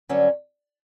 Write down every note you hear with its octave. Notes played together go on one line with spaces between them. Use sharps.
G2 D3 F#3 C#4